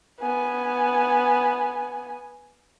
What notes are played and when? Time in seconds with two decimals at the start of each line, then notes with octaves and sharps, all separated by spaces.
0.21 B3 G#5